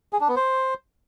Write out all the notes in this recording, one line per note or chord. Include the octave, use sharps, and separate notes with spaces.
G#4
D4
B3
C5